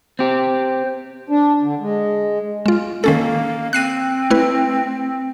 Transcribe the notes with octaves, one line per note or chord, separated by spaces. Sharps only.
C4 G4 C5
D4
D3
G#3
G#3 F4
D#3 A#3 C#4 A4
C4 F#6 C7 D#7
A3 E4 B4